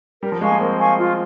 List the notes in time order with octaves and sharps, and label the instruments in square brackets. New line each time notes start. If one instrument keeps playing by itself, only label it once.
[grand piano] G3 [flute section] A#4
[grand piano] F3
[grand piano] G#3 [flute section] F5 G#5 C#6
[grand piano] A#3
[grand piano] C4 [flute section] A#4
[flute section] F5 G#5 C#6
F4